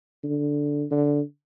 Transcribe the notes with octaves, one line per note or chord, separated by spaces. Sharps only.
D3
D3